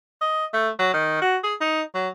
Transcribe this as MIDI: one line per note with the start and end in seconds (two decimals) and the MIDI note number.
0.21 0.45 75
0.53 0.69 57
0.79 0.92 54
0.94 1.20 51
1.22 1.37 66
1.44 1.54 68
1.61 1.81 63
1.95 2.08 54